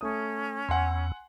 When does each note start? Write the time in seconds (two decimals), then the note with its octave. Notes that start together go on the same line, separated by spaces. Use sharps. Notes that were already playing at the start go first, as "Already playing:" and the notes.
0.01 A3 C#4 D#6
0.69 E2 F#5 G#5 C6